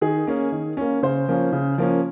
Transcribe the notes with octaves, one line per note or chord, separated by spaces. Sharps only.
D#3 G#4
A#3 C#4
D#3
A#3 C#4
C#3 C5
F3 A#3 C#4
C#3
F3 A#3 C#4